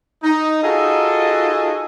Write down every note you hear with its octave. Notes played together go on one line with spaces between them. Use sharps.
D#4
D#4 F4 F#4 G#4 A4 D#5